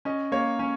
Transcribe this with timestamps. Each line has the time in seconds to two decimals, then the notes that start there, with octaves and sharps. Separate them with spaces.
0.05 C#4 D#5
0.32 A#3 C#5
0.59 C#4